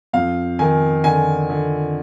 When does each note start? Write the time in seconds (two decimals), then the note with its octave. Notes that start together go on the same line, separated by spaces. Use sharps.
0.13 F2 F5
0.59 D#3 G#5
1.04 D3 G#5
1.50 D3